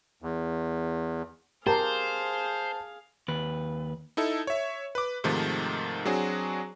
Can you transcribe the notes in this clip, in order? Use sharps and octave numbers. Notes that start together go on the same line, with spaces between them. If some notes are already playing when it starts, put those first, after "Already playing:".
E2
G4 G#4 A#4 C5 F5 A5
D#2 B4
D#4 E4 A4
C#5 E5
B4 D6
G#2 C3 D#3 F3 A3
F#3 C4 D4 F#4 G#4